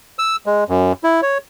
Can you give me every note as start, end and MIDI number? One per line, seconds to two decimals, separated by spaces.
0.19 0.36 88
0.46 0.64 56
0.69 0.93 42
1.04 1.21 64
1.22 1.38 73